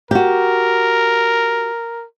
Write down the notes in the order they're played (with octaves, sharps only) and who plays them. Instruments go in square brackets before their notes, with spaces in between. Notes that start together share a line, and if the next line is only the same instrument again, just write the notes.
[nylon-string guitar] F#4 G4 [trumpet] A#4